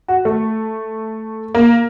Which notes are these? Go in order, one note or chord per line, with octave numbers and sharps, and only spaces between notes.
F#4
A3
A#3